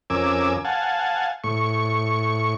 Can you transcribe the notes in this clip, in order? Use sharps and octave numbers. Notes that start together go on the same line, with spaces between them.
F2 C#4 A#4 G#5 D6 E6
F5 F#5 G#5 A5
A2 C#6